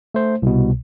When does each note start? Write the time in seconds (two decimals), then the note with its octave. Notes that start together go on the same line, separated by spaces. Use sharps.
0.14 A3 C5
0.42 C2 B2